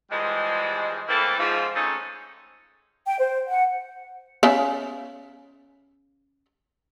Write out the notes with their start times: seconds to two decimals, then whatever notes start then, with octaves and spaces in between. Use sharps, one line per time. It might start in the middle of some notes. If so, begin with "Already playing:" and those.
0.11 E3 F3 G3 G#3
1.08 E3 A3 A#3 C4 E4 A4
1.38 G#2 F3
1.75 G#3 A3 C4 C#4 D#4
3.06 G5
3.19 C5
3.47 F#5
4.43 C#3 B3 E5